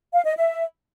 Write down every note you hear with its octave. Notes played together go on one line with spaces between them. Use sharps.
F5
D#5
E5